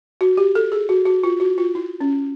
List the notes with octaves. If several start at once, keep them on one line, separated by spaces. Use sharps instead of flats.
F#4
G4
A4
G#4
F#4
F#4
F4
F#4
F4
E4
C#4